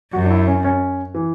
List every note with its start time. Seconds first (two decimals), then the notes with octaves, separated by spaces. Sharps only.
0.13 F#2 F#4
0.24 D4
0.30 E4
0.47 C#4
0.64 C#4
1.15 E3